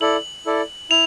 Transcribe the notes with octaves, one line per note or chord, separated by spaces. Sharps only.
E4 A4 D5 F#7
E4 A4 D5
E4 F7